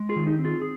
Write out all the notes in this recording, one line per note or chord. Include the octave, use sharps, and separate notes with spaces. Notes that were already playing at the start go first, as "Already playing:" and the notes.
Already playing: G#3
F4 G#4
D#3
D#4 G4
C4
F4 G#4
G#4